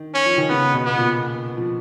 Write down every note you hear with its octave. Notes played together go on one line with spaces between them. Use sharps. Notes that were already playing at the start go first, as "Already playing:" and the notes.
Already playing: D#3
C#4
F3
D#3
C#3 B3
B2
B3
A#2
F3